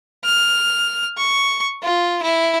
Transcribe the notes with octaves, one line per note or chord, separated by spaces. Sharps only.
F6
C#6
F4
E4